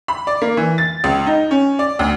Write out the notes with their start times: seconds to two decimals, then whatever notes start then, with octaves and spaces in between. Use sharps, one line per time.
0.08 B5
0.27 D5
0.42 A#3
0.57 E3
0.78 A6
1.04 C#2
1.27 D#4
1.51 C#4
1.79 D5
1.99 D2